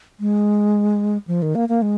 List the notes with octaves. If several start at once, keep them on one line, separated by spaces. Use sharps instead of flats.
G#3
F3
D#3
A#3
A#3
G#3